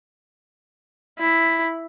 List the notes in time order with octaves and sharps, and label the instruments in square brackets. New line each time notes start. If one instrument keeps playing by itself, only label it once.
[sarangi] E4